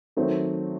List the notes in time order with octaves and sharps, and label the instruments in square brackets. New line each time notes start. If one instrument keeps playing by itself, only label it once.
[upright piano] D#3 F#3 A3 C4